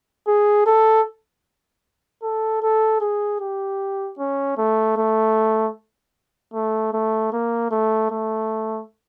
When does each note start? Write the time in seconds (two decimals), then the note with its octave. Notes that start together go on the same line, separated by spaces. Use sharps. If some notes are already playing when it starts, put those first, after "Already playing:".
0.27 G#4
0.66 A4
2.23 A4
2.62 A4
3.01 G#4
3.41 G4
4.19 C#4
4.58 A3
4.97 A3
6.54 A3
6.93 A3
7.33 A#3
7.71 A3
8.11 A3